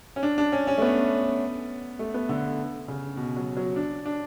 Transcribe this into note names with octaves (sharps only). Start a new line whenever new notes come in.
C#4
D4
D4
C#4
C#4
A3
B3
A3
B3
D3
C#3
B2
F#3
F#3
D4
D4